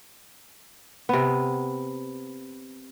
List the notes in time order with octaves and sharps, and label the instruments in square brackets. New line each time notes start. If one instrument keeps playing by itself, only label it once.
[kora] C3 B3